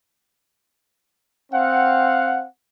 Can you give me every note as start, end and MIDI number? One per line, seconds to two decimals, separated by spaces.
1.52 2.46 60
1.52 2.46 77
1.52 2.46 78